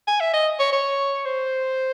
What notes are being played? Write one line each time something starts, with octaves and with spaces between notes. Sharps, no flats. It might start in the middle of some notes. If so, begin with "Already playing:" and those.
G#5
E5
D#5
C#5
C#5
C5